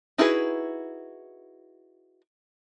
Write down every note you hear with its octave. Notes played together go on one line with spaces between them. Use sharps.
D#4 E4 F#4 G#4 B4